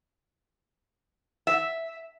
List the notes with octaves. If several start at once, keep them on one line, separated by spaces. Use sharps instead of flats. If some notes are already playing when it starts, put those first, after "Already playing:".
E5